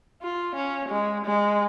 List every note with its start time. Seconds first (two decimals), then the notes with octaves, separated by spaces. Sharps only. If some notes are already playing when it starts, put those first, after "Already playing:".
0.22 F4
0.56 C#4
0.89 G#3
1.25 G#3